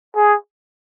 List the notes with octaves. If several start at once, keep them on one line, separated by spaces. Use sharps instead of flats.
G#4